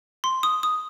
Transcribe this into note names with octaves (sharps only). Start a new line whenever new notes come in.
C6
D#6
D#6